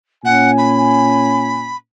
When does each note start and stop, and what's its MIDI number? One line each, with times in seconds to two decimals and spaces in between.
0.25 1.74 46
0.25 1.74 61
0.25 0.51 78
0.25 1.74 80
0.57 1.76 83